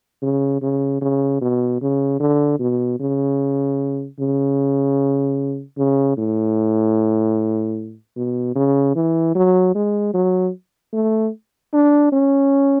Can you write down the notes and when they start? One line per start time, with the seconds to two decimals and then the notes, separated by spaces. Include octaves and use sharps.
0.22 C#3
0.62 C#3
1.01 C#3
1.41 B2
1.81 C#3
2.20 D3
2.60 B2
3.00 C#3
4.19 C#3
5.77 C#3
6.17 A2
8.16 B2
8.55 C#3
8.95 E3
9.35 F#3
9.75 G#3
10.14 F#3
10.93 A3
11.73 D4
12.12 C#4